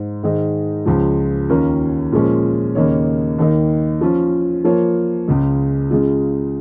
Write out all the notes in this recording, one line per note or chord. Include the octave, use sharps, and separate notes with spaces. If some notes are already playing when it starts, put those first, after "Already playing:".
Already playing: G#2
G#2 D#3 G#3 D#4
C#2 C#3 F3 G#3
D#2 D#3 C#4 F4 A#4
A#2 F3 G#3 C#4
D#2 C#3 A#3 D#4 C#5
D#2 D#3 A#3 D#4
F3 C#4 F4
F3 A#3 F4 C#5
C#2 C#3 G#3
C#3 G#3 F4